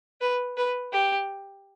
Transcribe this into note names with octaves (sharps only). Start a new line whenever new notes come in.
B4
B4
G4